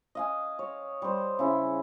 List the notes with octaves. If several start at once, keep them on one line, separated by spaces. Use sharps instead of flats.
D#5 F5 G#5
C#5
G3 C5
C#3 E4